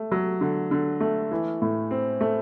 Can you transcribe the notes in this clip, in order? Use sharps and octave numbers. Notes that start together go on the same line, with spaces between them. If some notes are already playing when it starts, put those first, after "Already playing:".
Already playing: A3
F#3
D3
D3
A3
E3
A2
C4
A3